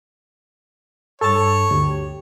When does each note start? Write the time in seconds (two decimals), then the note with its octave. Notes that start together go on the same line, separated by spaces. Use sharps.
1.21 G2 A4 C#5 A5
1.71 D2 G4